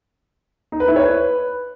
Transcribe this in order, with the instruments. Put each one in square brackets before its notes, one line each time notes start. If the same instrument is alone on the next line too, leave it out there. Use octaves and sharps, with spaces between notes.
[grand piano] D#4
B4
E4
C#5
B4